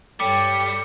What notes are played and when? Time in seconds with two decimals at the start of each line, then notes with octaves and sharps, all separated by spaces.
0.20 G2 G3 A4 C#5 G5 D6 C#7